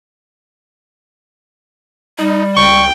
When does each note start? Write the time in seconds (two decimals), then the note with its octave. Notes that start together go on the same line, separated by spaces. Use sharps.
2.19 G3 D#4
2.57 C#2 G5 C#6